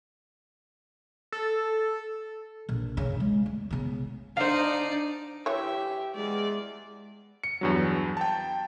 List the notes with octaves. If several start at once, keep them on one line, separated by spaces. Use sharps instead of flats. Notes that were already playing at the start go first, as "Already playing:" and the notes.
A4
A#1
C#3
G#3
A3
C#3 B3
D4 D#4 C5 D5 F5
E3 G4 C#5 E5
E2 G#3 D5
C#7
E2 G2 F#3
G5 A5